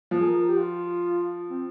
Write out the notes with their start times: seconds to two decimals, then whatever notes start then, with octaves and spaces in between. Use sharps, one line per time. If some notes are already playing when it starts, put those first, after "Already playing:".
0.11 F3
0.20 G#4
0.27 A#4
0.48 G4
0.58 F4
1.50 C4